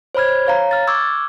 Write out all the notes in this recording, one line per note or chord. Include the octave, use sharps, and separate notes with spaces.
C5 C#5 B5 F6 G#6
C#5 F5 A#5
F6 A6
C#6 D6 E6 F6 G#6